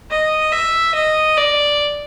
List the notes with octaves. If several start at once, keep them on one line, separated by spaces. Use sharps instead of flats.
D#5
E5
D#5
D5